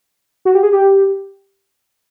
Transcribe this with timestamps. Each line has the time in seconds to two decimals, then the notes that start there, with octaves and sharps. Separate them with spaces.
0.45 F#4
0.55 G4
0.63 G#4
0.73 G4